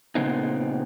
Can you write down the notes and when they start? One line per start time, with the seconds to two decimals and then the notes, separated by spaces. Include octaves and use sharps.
0.15 A#2 C#3 B3 C4 D#4